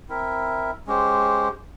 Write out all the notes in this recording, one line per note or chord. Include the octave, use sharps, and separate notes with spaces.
C4 E4 A#4 E5
G#3 C#4 G4 C5